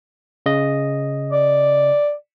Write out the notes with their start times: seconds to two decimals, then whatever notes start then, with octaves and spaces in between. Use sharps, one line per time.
0.46 C#3 D#5
1.32 D5